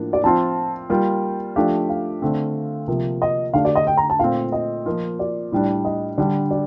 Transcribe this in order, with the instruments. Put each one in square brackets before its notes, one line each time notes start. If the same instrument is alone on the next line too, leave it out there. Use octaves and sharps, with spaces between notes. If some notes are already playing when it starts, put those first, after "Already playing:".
Already playing: [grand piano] A2 F3 A#3 D4
[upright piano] D5
[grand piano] F3 C4 F4 [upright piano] A5
[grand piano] G3 A#3 F4 [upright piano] G5
[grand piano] F3 A3 D4 G4 [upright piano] F5
[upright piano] F5
[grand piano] D3 A3 C4
C3 F3 A#3
[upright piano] D#5
[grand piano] D3 A3 D4 G4 [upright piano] F5
[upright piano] D5
D#5
G5
A#5
A5
[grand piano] A#2 A3 C4 [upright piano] F5
[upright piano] D#5
[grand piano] F3 A#3 F4
[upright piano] D5
[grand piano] A2 G3 D4
[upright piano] D#5
[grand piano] D3 G3 D4 [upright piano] D5
[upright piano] D5